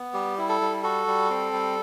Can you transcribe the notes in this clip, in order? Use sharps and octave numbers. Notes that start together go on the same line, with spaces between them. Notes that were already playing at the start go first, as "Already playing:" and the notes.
Already playing: B3
G3 G4
E4
A4
G3
F#4 A4
G3
C4
G3